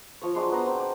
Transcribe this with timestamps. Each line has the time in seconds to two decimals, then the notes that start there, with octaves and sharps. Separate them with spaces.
0.21 F3 C#5
0.35 F#3 G#3 D4 C6
0.52 B3 A#5
0.66 C4
0.80 D5